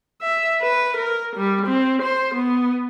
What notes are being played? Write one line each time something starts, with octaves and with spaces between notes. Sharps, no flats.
E5
B4
A#4
G3
C4
C5
B3